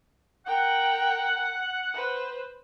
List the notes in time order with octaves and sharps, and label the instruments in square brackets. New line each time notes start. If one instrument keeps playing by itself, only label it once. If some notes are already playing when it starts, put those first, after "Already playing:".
[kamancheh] A#4 G5 [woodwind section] F#5
[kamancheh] B4 C5